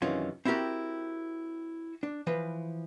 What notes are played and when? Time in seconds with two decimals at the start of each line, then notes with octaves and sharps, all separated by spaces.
0.02 F#2 C3 D#3 E3 C#4 F4
0.45 C4 E4 F#4 G4 A#4
2.03 D4
2.27 E3 F3 B4